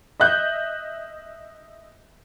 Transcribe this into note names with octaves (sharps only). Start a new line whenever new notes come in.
D#5 E5 F#6 G6